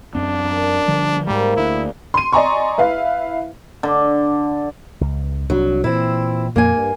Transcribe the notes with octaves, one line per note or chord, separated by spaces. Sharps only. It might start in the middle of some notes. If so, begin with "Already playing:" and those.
F#2 C4 D4
A#4 D5 A5
D3 F3 G3
G#2 G3 G#3 A#3 C4 G#4
D2 E4 D5 F5
C6 D#7
D5 D#5 G#5 A#5 C6 C#6
E4 B4 E5 F5
D3
C#2
C2 F#3 D4
A#2 E3 C4 E4
F2 A#2 A#3 G#5
G2